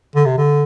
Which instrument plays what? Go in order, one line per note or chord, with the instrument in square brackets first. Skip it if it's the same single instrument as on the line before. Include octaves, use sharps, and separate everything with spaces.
[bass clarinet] D3
C3
D3